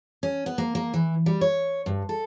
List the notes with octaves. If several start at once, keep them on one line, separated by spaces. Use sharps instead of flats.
C#4
B3
A#3
A#3
E3
G3
C#5
G2
A4